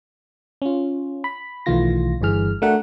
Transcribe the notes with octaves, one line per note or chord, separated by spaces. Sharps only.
C#4 F4
B5
B1 D#3 E3 A3 F4 A#6
G1 G2 E3 G#4 F6
A3 D4 F#4 A#4 F#5